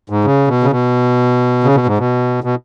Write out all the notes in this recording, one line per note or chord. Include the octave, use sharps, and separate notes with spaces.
G#2
C#3
B2
C#3
B2
C#3
B2
G#2
B2
B2